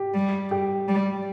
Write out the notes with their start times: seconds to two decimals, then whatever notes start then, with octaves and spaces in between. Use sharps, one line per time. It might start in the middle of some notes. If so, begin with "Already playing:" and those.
Already playing: G4
0.14 G3
0.51 G4
0.88 G3